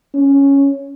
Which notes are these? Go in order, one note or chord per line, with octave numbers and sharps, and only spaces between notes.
C#4